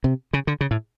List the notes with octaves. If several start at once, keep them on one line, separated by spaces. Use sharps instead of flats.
C3
C#3
D3
C#3
A2